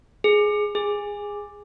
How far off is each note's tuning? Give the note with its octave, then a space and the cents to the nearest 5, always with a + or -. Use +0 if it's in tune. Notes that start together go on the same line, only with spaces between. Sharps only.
G#4 +5
G#4 -15